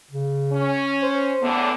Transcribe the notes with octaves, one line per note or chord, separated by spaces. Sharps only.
C#3
C#4
C5
E2 A2 D3 B3